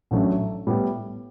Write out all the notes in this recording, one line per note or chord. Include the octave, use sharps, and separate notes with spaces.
A1 A2 F#3 A3 D4
A2 G3 B3